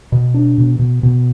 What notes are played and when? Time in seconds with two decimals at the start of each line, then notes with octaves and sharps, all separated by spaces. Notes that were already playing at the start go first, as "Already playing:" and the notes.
0.12 B2
0.34 D4
0.58 B2
0.79 B2
1.03 B2